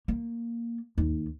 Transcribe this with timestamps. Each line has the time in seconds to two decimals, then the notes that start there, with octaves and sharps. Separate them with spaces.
0.08 A#3
0.98 D#2